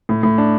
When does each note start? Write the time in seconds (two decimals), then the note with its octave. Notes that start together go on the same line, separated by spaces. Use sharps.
0.09 A2
0.23 A2
0.38 D4